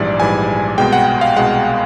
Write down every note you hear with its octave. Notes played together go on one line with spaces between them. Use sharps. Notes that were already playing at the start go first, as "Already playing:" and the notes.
Already playing: A#1 G#2 E3 G3 D5
A#1 G#2 E3 G3 G#5
C2 B2 G#3 G5
F#5
F#5
F5
C2 B2 G#3 F#5